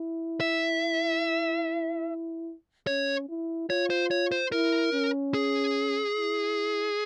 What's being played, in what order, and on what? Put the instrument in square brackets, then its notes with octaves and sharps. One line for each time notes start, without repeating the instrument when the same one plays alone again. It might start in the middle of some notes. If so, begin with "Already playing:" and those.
Already playing: [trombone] E4
[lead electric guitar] E5
[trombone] C#4 [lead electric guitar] C#5
[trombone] E4
[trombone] F4 [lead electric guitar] C#5
[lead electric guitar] C5
C#5
C5
[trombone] E4 [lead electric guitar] A#4
[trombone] C#4
[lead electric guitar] G#4
[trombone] E4